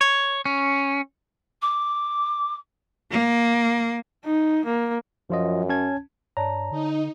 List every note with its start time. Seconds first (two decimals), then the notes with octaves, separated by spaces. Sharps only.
0.01 C#5
0.45 C#4
1.62 D6
3.11 A#3
4.25 D#4
4.65 A#3
5.30 F#2 F3 F4 D#5
5.69 C#4 A5 G#6
6.37 G2 C#5 D5 A5 A#5
6.71 D3 D#4